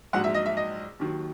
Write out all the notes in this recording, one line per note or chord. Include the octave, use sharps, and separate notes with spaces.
A#1 G#2 F#3 F#5
E5
D#5
E5
D#5
D#2 D#3 F#3